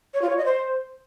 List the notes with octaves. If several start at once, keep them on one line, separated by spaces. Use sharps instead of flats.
C#5
F4
C#5
D#5
C5